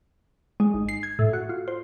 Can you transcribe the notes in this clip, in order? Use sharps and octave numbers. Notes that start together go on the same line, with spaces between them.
G#3
G#1
C7
G#6
A2
F#4
F4
C5